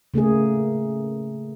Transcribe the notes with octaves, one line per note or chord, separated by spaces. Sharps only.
C#3 A3 A#3 G#4